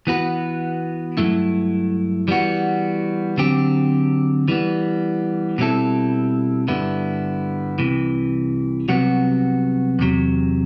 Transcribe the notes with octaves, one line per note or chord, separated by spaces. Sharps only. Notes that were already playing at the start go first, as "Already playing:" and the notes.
E3 B3 F#4 B4
G2 F#3 A3 E4
E3 G3 B3 F#4
D3 F#3 C4 G4
E3 G3 B3
B2 G3 C4 E4 A4
G2 D3 G3 B3 E4
C2 C3 E3
C2 C3 F#3 B3 F#4
E2 C3 F#3